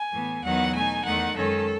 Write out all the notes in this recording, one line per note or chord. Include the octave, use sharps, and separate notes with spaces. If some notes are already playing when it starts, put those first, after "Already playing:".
Already playing: G#5
A2 E3 B3
E2 D#3 F#3 B3 D#4 F#5
B2 A3 D#4 G#5
E2 D#3 A3 D#4 F#5
F#2 D#3 G#3 C#4 A4